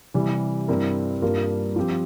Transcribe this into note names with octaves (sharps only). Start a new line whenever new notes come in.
C3 E3 G3
G2 G3 C4 E4 A#4
G2 G3 A#3 F4 A#4
F3 C4 G4